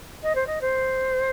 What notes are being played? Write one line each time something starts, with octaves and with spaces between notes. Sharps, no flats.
D#5
C5
D#5
C5